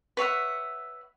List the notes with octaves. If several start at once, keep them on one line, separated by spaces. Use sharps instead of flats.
B4 C#5 E5 F#5